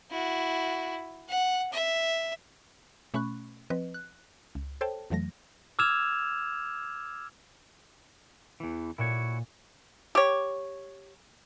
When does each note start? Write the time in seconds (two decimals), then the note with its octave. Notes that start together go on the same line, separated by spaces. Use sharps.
0.11 E4 F#4
1.29 F#5
1.72 E5
3.14 B2 A3 C#4 B5 C#6 F#6
3.70 F3 C4 B4 D#5
3.94 F#6
4.55 C#2
4.81 A4 C5 C#5 G5 A5
5.10 F2 E3 F#3 A3 A#6
5.79 D6 E6 F6 G#6 E7 F7
8.60 E2 E3
8.98 A#2 E4 F#4 C#5
10.15 G4 C#5